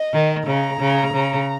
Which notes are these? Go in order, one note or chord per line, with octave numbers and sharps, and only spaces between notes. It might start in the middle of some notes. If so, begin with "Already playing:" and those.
Already playing: D#5
D#3
C#3 A#5
C#3
C#3